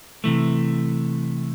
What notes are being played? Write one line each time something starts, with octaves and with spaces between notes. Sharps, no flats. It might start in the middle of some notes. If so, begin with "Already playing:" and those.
C3 E3 A3